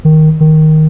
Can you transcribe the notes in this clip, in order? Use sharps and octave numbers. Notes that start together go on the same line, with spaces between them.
D#3
D#3